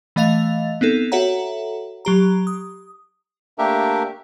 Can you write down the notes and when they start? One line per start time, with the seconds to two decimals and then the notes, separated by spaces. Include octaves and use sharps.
0.16 E3 A3 D#5 F5 A6 F7
0.81 B3 C4 D#4 A4
1.12 F#4 A4 C#5 E5 F#5 A#5
2.05 F#3 G4 A#5
2.47 D#6
3.58 A3 A#3 D4 G4 A#4 E5